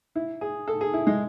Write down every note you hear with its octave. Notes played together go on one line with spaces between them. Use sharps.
E4
G#4
A4
G#4
E4
G#3